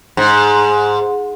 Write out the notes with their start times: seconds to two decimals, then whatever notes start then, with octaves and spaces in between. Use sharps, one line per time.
0.17 G#2